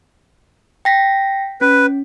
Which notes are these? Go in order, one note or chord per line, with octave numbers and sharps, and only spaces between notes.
G5 A#6 B6
C#4 B4